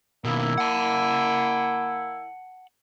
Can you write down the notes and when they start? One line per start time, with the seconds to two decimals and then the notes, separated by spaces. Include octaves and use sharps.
0.25 B2 D#3 A#3 E4
0.58 F#5 A5